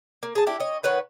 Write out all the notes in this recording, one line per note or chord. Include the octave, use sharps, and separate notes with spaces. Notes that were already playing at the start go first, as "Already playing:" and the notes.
A#3
G#4 A5
D4 E4 G4
C#5 D#5
D#3 B4 C#5 F#5